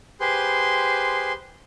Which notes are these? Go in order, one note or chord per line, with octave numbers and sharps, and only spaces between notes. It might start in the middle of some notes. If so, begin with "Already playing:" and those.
G4 G#4 B4 C5 C6